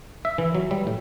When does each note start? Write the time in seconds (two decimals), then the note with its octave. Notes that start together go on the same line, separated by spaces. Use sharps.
0.25 E5
0.38 E3
0.55 F#3
0.71 G3
0.87 A2